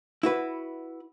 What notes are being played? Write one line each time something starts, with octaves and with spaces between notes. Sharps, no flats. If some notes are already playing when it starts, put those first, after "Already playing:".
E4 F#4 B4